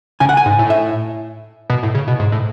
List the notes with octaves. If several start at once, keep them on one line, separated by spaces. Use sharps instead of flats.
C#3 G#5
F#5
G#5
G#2
A2
E5
B2
A2
C#3
B2
G#2
A2